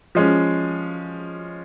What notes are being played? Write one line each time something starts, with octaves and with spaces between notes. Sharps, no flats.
F3 G#3 C#4